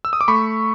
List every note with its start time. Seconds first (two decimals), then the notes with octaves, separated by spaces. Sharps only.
0.05 E6
0.13 D#6
0.21 D6
0.28 A3 B5 C#6